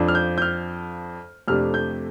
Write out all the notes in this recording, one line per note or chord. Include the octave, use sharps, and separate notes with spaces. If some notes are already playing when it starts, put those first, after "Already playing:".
Already playing: F2 F3 D4
F6
G6
G6
F6
F2 C3 A3 D4 F6
G6